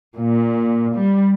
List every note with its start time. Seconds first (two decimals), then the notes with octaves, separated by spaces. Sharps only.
0.18 A#2
0.98 G3